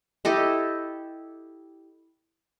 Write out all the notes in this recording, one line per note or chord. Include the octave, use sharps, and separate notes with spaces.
E4 G4 A4 D#5